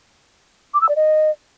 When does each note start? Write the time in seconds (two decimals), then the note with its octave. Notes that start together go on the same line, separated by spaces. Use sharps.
0.74 D6
0.81 E6
0.89 D5
0.96 D#5